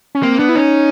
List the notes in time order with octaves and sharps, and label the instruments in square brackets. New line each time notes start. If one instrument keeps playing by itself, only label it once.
[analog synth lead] C#4
[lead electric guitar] A#3 [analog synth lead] C4
[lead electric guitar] B3 [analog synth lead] D4
[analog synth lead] E4
[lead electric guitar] C#4 [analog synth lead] D#4